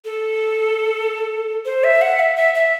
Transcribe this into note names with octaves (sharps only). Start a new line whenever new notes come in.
A4
C5
E5
F#5
E5
E5
E5